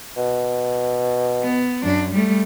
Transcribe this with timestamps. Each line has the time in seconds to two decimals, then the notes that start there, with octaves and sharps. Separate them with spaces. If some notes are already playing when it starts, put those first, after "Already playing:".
0.17 B2
1.43 B3
1.83 F#2 D4
2.12 G3 A3